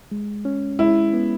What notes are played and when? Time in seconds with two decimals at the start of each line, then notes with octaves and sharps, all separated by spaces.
0.11 G#3
0.45 C#4
0.79 G#3 E4
1.14 B3